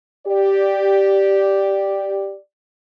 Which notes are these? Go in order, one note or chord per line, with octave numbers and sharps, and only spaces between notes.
G4 D5